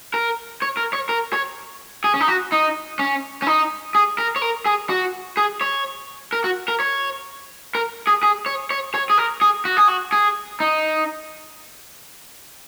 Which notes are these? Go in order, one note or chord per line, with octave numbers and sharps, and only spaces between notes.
A#4
C#5
A#4
C#5
A#4
C#5
G#4
C#4
D#4
F#4
D#4
C#4
C#4
D#4
G#4
A#4
C#5
A#4
G#4
F#4
G#4
C#5
A#4
F#4
A#4
C#5
A#4
G#4
G#4
C#5
C#5
C#5
G#4
A#4
G#4
F#4
G#4
F#4
G#4
D#4